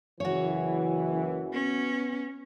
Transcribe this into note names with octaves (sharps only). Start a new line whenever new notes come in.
F#1 E3 F#4 C#5
B3 C#4